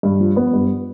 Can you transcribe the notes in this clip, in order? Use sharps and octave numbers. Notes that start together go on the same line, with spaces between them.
G2
F3
B3
G2